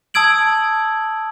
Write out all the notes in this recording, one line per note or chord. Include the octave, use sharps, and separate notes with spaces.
A5 D#6 E6 G#6 D7 F#7